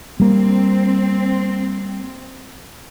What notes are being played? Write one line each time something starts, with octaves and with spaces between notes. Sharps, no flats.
G3 A#3 C4